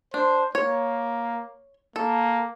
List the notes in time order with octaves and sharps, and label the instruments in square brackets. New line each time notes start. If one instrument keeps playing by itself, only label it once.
[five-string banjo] D4 [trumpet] C5
[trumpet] A#3 [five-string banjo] C#5
[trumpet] A#3 [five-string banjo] A4